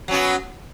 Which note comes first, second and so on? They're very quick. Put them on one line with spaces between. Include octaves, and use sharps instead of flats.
F#3 C#4 B3